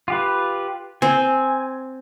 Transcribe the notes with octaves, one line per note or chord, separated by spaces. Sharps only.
F4 G4 B4
C4 G#5